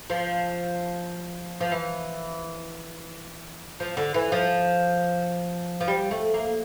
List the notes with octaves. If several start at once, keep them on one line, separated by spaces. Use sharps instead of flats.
F3
F3
E3
F3
D3
E3
F3
F3
G3
A3
A#3